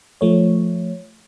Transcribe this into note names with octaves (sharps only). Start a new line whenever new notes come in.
F3 A3 C#5